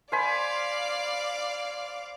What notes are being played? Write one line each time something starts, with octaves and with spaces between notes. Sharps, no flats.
C5 D5 F5 G#5 B5